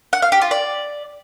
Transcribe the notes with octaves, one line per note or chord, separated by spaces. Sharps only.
F#5
F5
G4
F4
D5